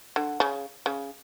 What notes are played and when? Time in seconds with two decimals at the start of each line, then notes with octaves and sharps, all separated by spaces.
0.16 D3
0.40 C#3
0.86 C#3